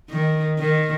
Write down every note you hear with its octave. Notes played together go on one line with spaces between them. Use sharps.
D#3
D#3